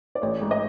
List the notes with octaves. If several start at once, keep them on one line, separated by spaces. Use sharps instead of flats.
D5
A1 C#5
G#2
D#5